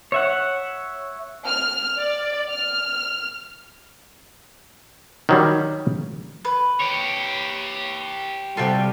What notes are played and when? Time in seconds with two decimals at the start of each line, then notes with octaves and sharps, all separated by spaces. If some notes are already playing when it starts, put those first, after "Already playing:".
0.12 C#5 E5 F#5
1.46 F6
1.99 D5
2.51 F6
5.29 D#3 F#3 G3
6.45 B4
6.80 G4 C#5
8.57 C3 G3 F4 F#4 A4 G5